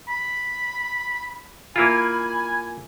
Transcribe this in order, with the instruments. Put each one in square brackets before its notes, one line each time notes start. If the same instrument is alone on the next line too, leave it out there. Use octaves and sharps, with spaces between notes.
[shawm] B5
[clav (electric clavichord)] A#3 E4 F4 [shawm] G#5 [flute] B5